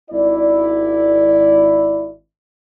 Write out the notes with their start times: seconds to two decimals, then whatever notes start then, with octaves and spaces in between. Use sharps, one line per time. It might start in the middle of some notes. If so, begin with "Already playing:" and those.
0.11 G#1 E4 D5